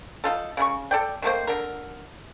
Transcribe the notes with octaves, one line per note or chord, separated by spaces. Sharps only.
D#4 F4 A4
C#3 E4 C#6
A4 D5 G5
D#3 A3 A#3 C5
D3 A#4